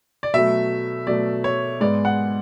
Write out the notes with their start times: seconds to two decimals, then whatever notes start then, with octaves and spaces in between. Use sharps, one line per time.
0.23 D5
0.34 B2 F#3 A3 E5
1.07 B2 F#3 A3 D5
1.44 C#5
1.80 G#2 G#3 B3 D5
2.05 F#5